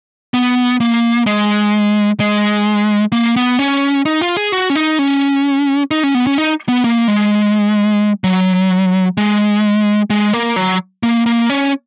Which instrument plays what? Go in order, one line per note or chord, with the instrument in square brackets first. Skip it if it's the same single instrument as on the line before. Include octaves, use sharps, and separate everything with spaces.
[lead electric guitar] B3
A#3
G#3
G#3
A#3
B3
C#4
D#4
F4
G#4
F#4
C#4
D#4
C#4
D#4
C#4
B3
C#4
D#4
B3
A#3
G#3
F#3
G#3
G#3
A#3
F#3
A#3
A#3
C#4